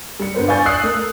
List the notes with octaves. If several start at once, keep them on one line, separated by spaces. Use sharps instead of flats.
G3 C#7
G2 B3 C5
D5 F5 G#5 C#6 G6 A6
D#6 E6 F#6 C7
A3 A#4